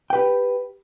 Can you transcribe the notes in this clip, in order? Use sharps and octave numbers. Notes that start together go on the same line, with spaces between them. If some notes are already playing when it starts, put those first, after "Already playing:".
G4 B4 G5